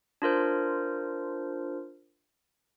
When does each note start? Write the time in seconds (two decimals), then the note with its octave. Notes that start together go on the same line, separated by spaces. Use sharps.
0.22 D4 F4 A#4 C5